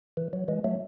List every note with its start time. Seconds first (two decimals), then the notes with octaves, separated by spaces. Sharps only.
0.17 E3
0.33 F#3
0.48 E3 G#3
0.64 F#3 A3